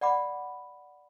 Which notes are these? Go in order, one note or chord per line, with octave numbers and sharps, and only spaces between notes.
D5 F#5 B5 D6